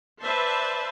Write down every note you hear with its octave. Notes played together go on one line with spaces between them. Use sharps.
B4 C5 D5 E5 A5